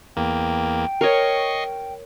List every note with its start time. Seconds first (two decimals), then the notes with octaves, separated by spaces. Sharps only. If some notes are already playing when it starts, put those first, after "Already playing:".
0.17 E2 A#3 G5
1.01 A#4 C#5 D#5 C#6 C7